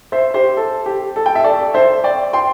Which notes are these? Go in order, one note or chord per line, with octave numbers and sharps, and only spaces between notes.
C5 E5
G4 C5
A4
G4
A4
G5
E5
A4 D5
C5 E5
D5 G5
G5 C6